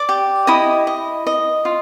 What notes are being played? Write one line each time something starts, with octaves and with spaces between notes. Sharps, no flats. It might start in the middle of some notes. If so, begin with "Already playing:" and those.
Already playing: D5 D6
G4
E4 D#5 D#6
D#5
D#5
F4